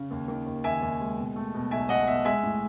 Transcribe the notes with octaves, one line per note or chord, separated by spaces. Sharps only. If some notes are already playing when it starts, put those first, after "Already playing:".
Already playing: C#3
D#2
D#3
D#2
D#2 E5 G#5
D#2
G#3
B2
A3
B2
B1 E5 G#5
B1 D#5 F#5
B2 E5
G#3 E5 G#5
A2